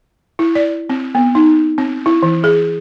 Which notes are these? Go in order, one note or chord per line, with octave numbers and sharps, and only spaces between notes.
E4
D5
C4
B3
D#4
C4
E4
E3
G#4